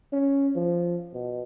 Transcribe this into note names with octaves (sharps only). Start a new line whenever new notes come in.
C#4
F3
B2